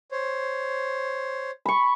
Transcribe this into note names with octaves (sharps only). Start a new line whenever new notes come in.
C5 C#5
B5 C#6